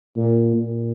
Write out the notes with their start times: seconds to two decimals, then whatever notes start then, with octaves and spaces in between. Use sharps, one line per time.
0.16 A#2
0.57 A#2